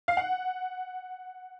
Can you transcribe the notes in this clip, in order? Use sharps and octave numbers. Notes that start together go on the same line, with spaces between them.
F5
F#5